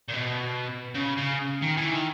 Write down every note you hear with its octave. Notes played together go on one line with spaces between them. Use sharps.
A#2
B2
C#3
C#3
D#3
E3
D#3